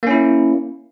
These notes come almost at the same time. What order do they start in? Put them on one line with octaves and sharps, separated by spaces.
A#3 C#4 E4